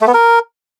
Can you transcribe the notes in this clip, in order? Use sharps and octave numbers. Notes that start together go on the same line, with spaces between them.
A3
B3
A#4